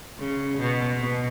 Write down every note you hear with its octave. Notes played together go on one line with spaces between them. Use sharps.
C#3
B2
B2